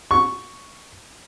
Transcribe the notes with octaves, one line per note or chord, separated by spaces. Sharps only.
C#6